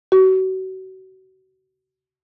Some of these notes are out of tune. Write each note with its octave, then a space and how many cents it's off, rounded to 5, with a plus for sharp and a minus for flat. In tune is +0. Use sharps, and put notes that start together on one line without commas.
F#4 +30